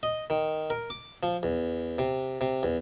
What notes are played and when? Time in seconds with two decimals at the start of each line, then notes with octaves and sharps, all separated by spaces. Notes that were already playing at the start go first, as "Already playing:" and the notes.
0.03 D#5
0.30 D#3
0.70 A#4
0.90 D6
1.23 F3
1.43 E2
1.98 C3
2.41 C3
2.63 E2